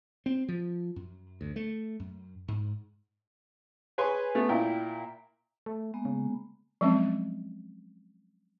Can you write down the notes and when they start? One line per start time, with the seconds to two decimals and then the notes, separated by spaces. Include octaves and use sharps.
0.26 C4
0.48 F3
0.96 F#2
1.41 D2
1.56 A3
2.00 F#2
2.48 G#2
3.98 G#4 B4 C#5 G#5 C6
4.35 A3 B3
4.49 A#2 A#3 E4 G5
5.66 A3
5.94 G#3 A#3 B3
6.05 C#3
6.81 F3 F#3 G#3 C4 C#4